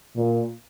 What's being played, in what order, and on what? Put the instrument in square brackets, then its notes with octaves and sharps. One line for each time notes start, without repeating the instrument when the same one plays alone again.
[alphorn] A#2